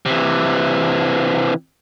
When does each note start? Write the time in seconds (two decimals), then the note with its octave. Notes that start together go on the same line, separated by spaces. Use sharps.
0.06 C3 E3